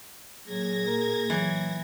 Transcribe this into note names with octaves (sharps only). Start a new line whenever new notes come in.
A#2 F#3 G#4 G#6 A#6
A#4
E3 F#3